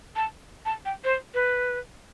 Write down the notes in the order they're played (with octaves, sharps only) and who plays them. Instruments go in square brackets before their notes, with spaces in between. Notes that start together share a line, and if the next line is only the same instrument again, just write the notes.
[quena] A5
A5
G5
C5
B4